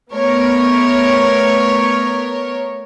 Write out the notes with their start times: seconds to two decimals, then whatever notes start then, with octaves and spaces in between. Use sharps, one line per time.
0.12 A3 B3 A#4 C#5